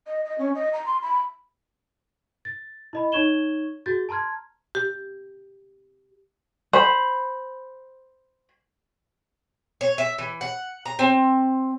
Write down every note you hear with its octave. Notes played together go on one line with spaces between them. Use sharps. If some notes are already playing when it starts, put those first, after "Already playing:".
D#5
D#5
C#4
D#5
A#5
C6
B5
A6
E4 D#5 B5
D#4 C#5 C#6 G#6 E7 G7
F#4 G#4 G6 A6
A5 A#5 C6 F6 G#6
G4
C5 B5
C#5
E5
E3
F#5
A#5
C4